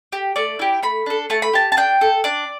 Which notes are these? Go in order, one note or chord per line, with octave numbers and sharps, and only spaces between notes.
G4
A3 D5
E4 G4
A3 B5
D4 A4
A3 A5
B5
G4 A5
A5
D4 G5
A4
D4 D5